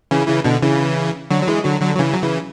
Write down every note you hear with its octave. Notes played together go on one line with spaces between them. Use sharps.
C#3 E3
C#3 E3
B2 D3
C#3 E3
D3 F#3
F#3
E3 G#3
D3 F#3
D3 F#3
F#3
C#3 E3
F#3
C#3 E3